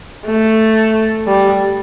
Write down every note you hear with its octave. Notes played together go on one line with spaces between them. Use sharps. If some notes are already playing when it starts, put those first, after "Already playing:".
A3
G3